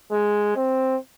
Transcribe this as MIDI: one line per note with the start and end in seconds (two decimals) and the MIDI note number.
0.11 0.52 56
0.56 0.97 60